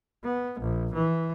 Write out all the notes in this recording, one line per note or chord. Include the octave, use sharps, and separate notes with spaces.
B3
A#1
E3